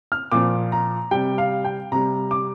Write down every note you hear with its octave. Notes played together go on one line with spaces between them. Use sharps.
F6
A#2 F3 D6
A#5
C3 G3 G5
F5
G5
C3 G3 A#5
D6